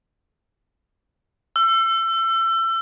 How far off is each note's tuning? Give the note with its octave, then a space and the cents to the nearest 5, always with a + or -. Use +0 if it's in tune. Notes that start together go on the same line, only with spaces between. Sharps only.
E6 +30